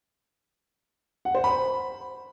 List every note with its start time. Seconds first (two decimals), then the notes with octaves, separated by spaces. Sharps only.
1.25 F#5
1.35 C5
1.44 B5